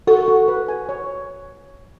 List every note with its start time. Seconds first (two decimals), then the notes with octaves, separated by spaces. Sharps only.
0.07 F#4 A4
0.28 F#4
0.48 B4
0.68 G#5
0.89 C#5